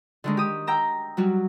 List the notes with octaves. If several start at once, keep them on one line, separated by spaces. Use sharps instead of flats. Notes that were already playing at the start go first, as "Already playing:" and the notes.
D3 D#3 G#3
G4 D#6
G5 A#5 E6
F#3 G3 F#4